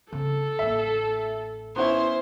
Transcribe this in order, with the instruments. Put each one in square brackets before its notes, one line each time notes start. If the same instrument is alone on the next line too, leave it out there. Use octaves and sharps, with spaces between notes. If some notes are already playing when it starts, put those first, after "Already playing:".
[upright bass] C#3 C4 [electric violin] A4
[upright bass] A1 A#3 [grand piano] E5
[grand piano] B3 C#4 E4 [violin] C5